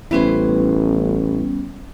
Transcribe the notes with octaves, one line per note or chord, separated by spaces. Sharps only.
A1 G3 B3 C#4 E4 B4 C5